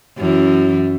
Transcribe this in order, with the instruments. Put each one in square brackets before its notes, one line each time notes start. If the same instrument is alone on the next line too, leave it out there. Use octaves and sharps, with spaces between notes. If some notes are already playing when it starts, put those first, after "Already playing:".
[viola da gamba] F#2 E3